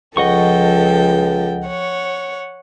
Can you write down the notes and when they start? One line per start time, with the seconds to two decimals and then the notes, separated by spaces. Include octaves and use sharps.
0.17 C#2 F3 A4 D#5 F#5 G5 C#6
1.66 C#5 F#5